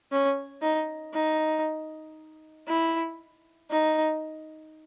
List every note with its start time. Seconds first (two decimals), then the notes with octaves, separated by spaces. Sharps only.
0.12 C#4
0.62 D#4
1.14 D#4
2.67 E4
3.71 D#4